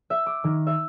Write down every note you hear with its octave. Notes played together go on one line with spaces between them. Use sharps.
E5
D6
D#3
E5